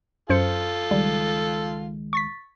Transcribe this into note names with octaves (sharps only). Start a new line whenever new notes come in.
F#2 F4 A4 C5 C#7
C#2 D#3 G3 G#3
C#6 A6 B6